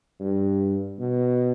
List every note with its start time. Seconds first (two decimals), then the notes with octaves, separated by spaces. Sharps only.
0.20 G2
0.99 B2